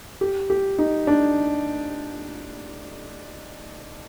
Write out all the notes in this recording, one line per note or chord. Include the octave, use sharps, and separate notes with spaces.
G4
G4
D#4
D4